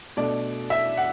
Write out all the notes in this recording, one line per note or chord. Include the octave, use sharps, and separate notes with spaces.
B2 A3 D4 D5
E5
F#5